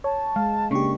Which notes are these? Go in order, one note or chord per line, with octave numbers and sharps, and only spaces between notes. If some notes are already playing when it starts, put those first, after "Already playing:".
C#5 A5
G#3 F5
C#3 A#3 D4 G4 C#6